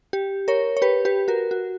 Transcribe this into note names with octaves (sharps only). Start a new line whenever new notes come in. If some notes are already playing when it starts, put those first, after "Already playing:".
G4
A#4 C#5
C#5
G4 B4
G4 B4
F#4 A#4
F#4